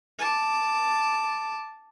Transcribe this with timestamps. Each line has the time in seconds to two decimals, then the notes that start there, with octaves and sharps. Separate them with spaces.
0.19 A5 D6